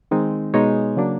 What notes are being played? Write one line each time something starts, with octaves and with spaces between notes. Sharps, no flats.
D#3 G#3 C4 D#4
B2 G#3 B3 D#4 C#5
C#3 F#3 A#3 D4